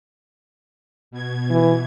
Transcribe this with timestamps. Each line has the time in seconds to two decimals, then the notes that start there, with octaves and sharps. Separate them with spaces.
1.11 B2 G#6
1.50 E3